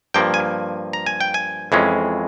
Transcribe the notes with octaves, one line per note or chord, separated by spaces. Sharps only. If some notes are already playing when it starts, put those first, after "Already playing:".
G2 F3 A#3 G5
G#5
A#5
G#5
G5
G#5
F2 E3 G#3 C#4